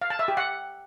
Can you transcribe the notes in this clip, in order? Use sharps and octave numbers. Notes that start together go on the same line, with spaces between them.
F5
A5
E5
G4
F#5